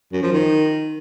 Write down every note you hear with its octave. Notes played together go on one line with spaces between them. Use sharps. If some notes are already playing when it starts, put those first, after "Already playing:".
F#2
F3
D#3